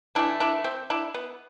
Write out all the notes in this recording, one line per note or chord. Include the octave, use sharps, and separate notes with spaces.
E3 A3 D4 E4
D4 E4
C4
D4 E4
B3